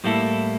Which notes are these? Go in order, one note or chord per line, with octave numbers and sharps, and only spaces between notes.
A2 G3 A#3 E4 A4